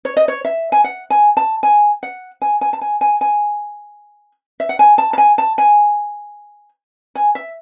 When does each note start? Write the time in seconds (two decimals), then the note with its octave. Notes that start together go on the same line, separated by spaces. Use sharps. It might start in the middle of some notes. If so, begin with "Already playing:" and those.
0.05 C#5
0.17 D#5
0.28 C#5
0.45 E5
0.72 G#5
0.84 F#5
1.10 G#5
1.37 A5
1.63 G#5
2.03 F#5
2.42 G#5
2.61 G#5
2.73 A5
2.81 G#5
3.01 G#5
3.21 G#5
4.60 E5
4.69 F#5
4.79 G#5
4.98 A5
5.13 A5
5.18 G#5
5.38 A5
5.58 G#5
7.15 G#5
7.35 E5